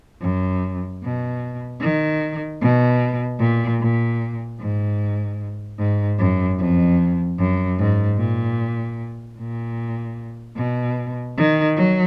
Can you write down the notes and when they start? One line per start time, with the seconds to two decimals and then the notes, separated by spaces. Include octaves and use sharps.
0.22 F#2
1.03 B2
1.82 D#3
2.61 B2
3.40 A#2
3.80 A#2
4.60 G#2
5.79 G#2
6.19 F#2
6.59 F2
7.39 F#2
7.79 G#2
8.18 A#2
9.38 A#2
10.57 B2
11.37 D#3
11.77 F#3